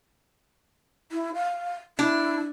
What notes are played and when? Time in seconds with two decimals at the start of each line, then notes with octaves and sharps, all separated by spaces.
1.12 E4
1.35 F5
1.99 D4 E4